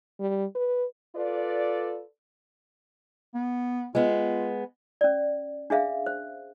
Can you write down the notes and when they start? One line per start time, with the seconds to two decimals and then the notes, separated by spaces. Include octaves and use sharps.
0.20 G3
0.56 B4
1.16 F4 A4 B4 D5
3.34 B3
3.95 G#3 B3 F4
5.01 C#4 D5
5.70 D4 G#4 E5 F5
6.06 C5